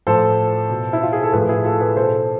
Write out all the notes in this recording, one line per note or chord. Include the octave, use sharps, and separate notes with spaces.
A2 F3 A4 C5
B2
E4
F4
G#4
A4
A2 F3 G#4 B4
E4 G#4
F4 A4
G#4 B4
B2 A4 C5